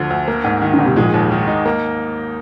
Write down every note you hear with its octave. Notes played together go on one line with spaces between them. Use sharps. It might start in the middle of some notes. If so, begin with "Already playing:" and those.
Already playing: D2 D3 F3
D2
A#3
G#2
D#3
D3
G#2
C3
A#1 A#2 G#3
D#2
D#3
D#4
A#3